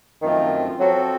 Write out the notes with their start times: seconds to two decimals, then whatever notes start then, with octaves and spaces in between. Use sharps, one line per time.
0.22 F#2 D#3 F3 A3 C4 F4
0.80 F3 F#3 C4 F#4 A4